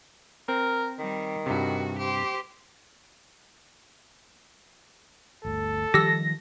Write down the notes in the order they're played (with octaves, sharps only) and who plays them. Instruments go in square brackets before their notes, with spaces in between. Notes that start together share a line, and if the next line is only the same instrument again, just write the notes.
[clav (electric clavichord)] C4 [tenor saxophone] A#4
[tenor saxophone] D#3 [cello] G3
[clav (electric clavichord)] G2 C3 [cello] F#4
[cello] G4 C5
[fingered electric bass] G1 D2 [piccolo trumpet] A4
[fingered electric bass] D#3 F3 G3 [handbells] G4 E6 [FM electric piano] A#6